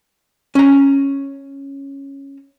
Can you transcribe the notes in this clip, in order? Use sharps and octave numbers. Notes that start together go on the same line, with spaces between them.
C#4 A#5